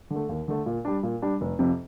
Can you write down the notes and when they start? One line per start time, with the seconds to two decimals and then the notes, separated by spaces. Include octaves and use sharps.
0.11 D3
0.16 A3
0.29 D#2
0.48 D3 A3
0.66 A#2
0.85 G3 D4
1.03 A#2
1.22 G3 D4
1.41 F1
1.59 F2 C3